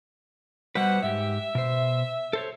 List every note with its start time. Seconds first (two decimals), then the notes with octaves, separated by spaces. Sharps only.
0.75 B2 G3 B4 C5 F#5
1.03 G#2 G4 E5
1.55 B2 C5
2.33 A4 C5 C#5